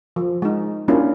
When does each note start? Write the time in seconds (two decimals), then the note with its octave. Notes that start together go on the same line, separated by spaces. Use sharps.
0.16 F3
0.42 G#3 D#4
0.88 G3 A#3 C#4 D4 E4 F4